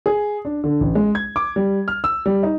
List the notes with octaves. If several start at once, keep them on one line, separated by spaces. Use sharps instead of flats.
G#4
D4
D3
A1
G#3
G#6
D6
G3
F6
E6
G3
D#4